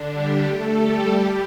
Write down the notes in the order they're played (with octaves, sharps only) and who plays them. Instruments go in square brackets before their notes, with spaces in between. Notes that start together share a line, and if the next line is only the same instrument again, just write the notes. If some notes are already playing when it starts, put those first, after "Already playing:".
Already playing: [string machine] D3 D4
G3 G4
A3 A4
G3 G4
G3 G4